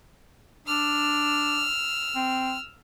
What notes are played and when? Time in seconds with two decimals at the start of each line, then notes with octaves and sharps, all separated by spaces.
0.67 D4 E6 F6
2.16 C4